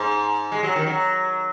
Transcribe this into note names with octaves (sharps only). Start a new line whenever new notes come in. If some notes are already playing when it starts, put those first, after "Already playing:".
Already playing: G#2
G#3
F#3
D#3
F#3